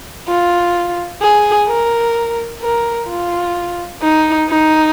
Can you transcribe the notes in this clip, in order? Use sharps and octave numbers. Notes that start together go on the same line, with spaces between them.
F4
G#4
A#4
A#4
F4
D#4
D#4